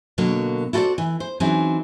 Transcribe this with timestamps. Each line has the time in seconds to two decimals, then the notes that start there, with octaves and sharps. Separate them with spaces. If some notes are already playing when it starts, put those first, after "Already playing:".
0.18 B2 D3 F#3 A#3
0.73 E4 F#4 A4 B4 C5 D5
0.98 E3
1.20 C5
1.40 E3 F#3 C4 C#4 D#4 G#4